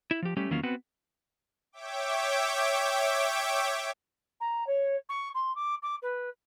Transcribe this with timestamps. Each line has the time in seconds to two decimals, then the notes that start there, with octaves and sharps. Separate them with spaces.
0.11 E4
0.22 F3 G4
0.37 G3 A3 C#4 G4
0.50 E2 D#3 F#3 A#3 C#4 F4
0.63 B3 C4 F#4 B4 F#5
1.72 C#5 E5 G5 D6
4.40 A#5
4.67 C#5
5.09 C#6
5.34 C6
5.55 D6
5.82 D6
6.02 B4